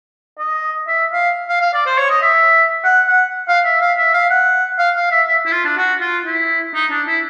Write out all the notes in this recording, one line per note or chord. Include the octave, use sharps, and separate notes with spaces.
D#5
E5
F5
F5
F5
D5
C5
C#5
D#5
E5
F#5
F#5
F5
E5
F5
E5
F5
F#5
F5
F5
E5
E5
E4
F4
D4
F#4
F4
E4
D#4
D4
E4